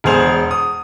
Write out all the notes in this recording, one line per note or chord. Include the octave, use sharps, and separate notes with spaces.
E1 E2 G#4 C5 F7
D#6